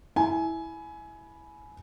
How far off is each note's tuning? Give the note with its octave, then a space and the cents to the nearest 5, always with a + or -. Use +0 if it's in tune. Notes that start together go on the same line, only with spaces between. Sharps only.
E4 -10 G#5 +20